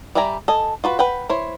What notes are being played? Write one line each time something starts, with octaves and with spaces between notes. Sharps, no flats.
G3 D5 E5 G#5 A#5
A4 D#5 G#5
F4 F#4 B4
B4 F#5 G5
E4 C5 C#5